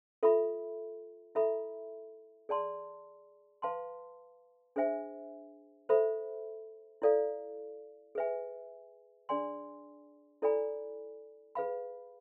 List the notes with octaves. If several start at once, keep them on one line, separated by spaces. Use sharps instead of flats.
F4 A4 E5 B5
E4 A4 E5 B5
G#4 D5 A5 C6
B4 F5 A5 C6
D4 G#4 C5 E5 G#5
A4 C5 E5 B5
E4 A4 D5 F5
G#4 B4 E5 G#5
D4 G#4 D5 G#5 C6
E4 A4 D5 G#5 B5
G#4 B4 F5 B5